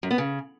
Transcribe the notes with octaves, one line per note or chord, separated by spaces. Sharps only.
F#2
B3
C#3